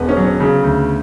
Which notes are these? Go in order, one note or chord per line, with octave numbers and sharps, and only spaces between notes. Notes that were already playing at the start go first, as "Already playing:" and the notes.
Already playing: E1 B3
C#4
F#3
C#4
C#3
D2